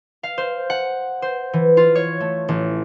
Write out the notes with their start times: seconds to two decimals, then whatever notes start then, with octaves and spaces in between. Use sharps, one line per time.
0.23 F5
0.38 C5
0.70 F#5
1.22 C5
1.53 E3
1.77 F4
1.95 C#5
2.20 A3
2.48 A1